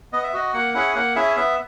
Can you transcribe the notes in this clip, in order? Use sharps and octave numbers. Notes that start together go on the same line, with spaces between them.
B3 D#5
E5
F#4 D#5
A#3 F#5
C#4 E4 G#4 F#5
A#3 F#5
C#4 E4 G#4 E5
B3 E5